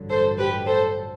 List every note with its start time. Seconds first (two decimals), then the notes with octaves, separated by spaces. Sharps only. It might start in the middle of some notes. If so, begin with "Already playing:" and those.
Already playing: A1 G2 D3 F#3
0.10 A4 C5
0.38 G4 B4
0.67 A4 C5